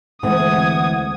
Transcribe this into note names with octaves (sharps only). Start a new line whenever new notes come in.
D2 E3 G#3 C4 F#5 D#6 G#6